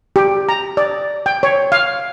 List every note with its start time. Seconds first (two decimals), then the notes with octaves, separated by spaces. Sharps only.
0.16 G4
0.49 A#5
0.77 D5
1.26 G5
1.43 C#5
1.72 F5